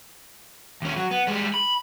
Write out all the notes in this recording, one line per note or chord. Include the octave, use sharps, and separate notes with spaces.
D#2 C#4
F#3
B3
G3 G#3
B5